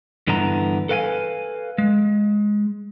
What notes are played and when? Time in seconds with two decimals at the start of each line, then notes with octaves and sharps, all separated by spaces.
0.27 G2 D3 E3 B3 A#5
0.89 A4 B4 F5 G5 G#5
1.78 G#3